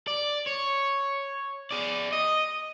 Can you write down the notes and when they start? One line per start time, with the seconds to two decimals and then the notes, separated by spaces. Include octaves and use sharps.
0.07 D5
0.47 C#5
1.71 G#4 D5
2.12 D#5